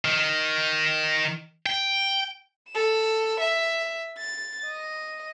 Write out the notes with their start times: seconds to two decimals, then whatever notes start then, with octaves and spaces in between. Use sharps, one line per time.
0.05 D#3
1.66 G5
2.71 A4 E7
3.40 E5
4.18 A6
4.66 D#5